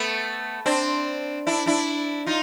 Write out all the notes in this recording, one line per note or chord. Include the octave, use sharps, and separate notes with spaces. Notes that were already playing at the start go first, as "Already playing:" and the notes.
Already playing: A3 B3
C4 D4
D4 E4
D4 E4
D#4 F4